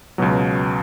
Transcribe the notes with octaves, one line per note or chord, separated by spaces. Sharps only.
C#2 B2 F#3